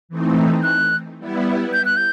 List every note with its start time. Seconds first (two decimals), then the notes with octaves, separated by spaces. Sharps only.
0.09 E3 A3 C4 D#4
0.63 F#6
1.18 G3 B3 E4
1.73 G6
1.85 F#6
1.97 G6